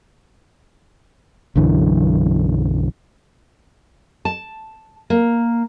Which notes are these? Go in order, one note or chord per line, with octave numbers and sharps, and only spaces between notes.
B1 F#2 D3 E3
A5
A#3